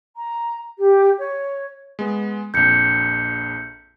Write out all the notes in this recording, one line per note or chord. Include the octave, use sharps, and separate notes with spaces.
A#5
G4
C#5
G#3 B3
A#1 F2 G6 C#7